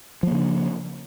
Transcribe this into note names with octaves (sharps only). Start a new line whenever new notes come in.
C#3 F3 A#3 D4